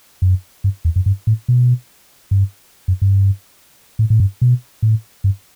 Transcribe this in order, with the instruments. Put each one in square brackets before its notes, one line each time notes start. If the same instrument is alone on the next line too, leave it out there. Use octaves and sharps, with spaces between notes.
[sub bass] F#2
G2
E2
F#2
G2
A2
B2
G2
F#2
G2
A2
A2
G2
B2
A2
G2